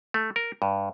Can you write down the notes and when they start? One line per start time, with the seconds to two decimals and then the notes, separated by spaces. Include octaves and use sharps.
0.14 A3
0.36 A#4
0.62 G2